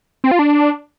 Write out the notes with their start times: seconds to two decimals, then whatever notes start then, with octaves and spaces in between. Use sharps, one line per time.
0.24 C4
0.31 F4
0.39 D4